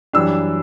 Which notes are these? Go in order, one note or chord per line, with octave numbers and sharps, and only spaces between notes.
F#2 E3 G3 D4 E6